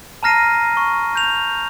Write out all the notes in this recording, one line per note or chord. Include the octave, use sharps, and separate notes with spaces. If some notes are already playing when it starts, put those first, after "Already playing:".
A5 A#5 F6 A#6 C7 D#7
C#6
G6 F7